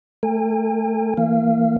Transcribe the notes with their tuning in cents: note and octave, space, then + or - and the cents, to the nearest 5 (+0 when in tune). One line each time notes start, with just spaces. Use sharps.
A3 +0 A4 +35 G#5 -45
E3 +0 A#3 -25 F5 -30